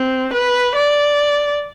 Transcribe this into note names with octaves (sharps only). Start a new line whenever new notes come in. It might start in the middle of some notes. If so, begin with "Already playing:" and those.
Already playing: C4
B4
D5